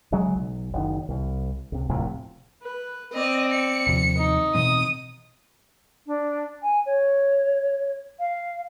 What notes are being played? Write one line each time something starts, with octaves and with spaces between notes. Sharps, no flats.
C#3 F#3 G#3
B1
F#1 D#3
C2
C#2 C3
D#1 A#1 A2 C3
B4
C4 D5 D#5
C#7
D#2 C3 F3
D#4
B2 E3 C4 D#6
D4
G#5
C#5
F5